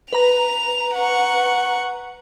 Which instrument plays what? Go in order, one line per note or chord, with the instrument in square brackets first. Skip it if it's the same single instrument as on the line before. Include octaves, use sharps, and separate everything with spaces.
[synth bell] B4 A#5 [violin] F7
[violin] F#5 C#6